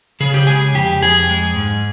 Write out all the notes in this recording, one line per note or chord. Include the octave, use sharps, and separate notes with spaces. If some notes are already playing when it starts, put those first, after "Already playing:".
C#3 G#4
G4
G#3 G#4
F2 G4
F2 G#4
G#3
G#2